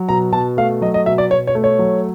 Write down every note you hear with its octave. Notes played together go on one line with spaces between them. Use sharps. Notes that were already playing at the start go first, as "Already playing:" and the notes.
Already playing: F#3
B2 A#5
B2 A5
A3 F5
F#3 D#5
D#5
B2 E5
D5
B2 C#5
C#5
A3
C#5
F#3